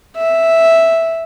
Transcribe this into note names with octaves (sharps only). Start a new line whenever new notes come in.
E5